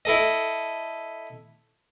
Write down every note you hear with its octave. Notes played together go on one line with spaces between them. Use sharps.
E4 A4 D#5